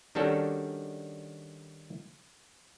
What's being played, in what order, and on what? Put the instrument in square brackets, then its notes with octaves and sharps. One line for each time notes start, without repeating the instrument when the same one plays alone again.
[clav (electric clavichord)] D#3 G3 C#4 D4 F#4 A4